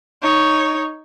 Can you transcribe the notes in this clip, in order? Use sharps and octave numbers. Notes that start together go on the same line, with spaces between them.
D#4 C#5